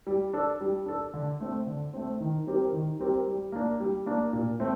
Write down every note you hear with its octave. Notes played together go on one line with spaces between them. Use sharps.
G3
D4 A4
G3
D4 A4
D3
A3 C4
D3
A3 C4
D#3
G3 C4 G4 A#4
D#3
G3 C4 G4 A#4
G3
A#3 D4
G3
A#3 D4
A#2
A3 C4